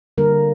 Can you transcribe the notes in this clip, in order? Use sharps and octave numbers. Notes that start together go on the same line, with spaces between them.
D3 G3 A#3 A#4